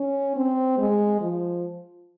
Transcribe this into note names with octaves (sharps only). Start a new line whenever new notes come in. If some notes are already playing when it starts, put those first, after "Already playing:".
Already playing: C#4
C4
G#3
F3